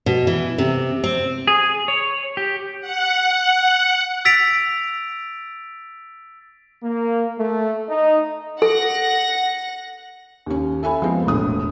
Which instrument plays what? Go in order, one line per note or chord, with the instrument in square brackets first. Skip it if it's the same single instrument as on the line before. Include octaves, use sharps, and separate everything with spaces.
[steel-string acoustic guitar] B2
E3
C3
C4
[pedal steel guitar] G#4
C#5
G4
[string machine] F#5
[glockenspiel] E6 A6 B6 D7 F7
[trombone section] A#3
A3
D#4
[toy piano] A4 [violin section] F#5 A#6
[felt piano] D#2 C#4
A4 E5 G#5 B5
F3 G#3 B3 C4
E1 A#1 A2 D#6